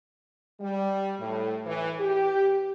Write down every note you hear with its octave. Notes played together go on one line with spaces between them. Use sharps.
G3
A2
E3
G4